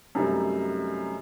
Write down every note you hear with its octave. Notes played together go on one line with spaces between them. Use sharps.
F#2 C3 G3 A3 C4 D#4